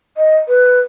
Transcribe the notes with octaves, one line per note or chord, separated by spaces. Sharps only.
D#5
B4